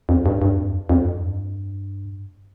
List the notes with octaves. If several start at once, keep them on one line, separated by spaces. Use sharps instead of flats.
F2
G2
G2
F2
F2
G2